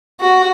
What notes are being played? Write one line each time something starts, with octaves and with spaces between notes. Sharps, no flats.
F#4